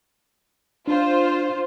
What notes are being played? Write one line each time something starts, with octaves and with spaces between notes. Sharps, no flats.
D4 F4 C5